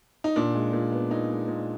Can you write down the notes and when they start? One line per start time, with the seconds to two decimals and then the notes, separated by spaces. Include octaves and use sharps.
0.24 D#4
0.36 A#2 D4
0.55 G#3
0.73 A#2
0.92 B3
1.11 A#2 D#4
1.30 G#3
1.48 A#2